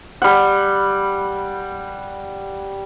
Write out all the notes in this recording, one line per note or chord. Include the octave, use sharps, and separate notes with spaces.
G3 F#5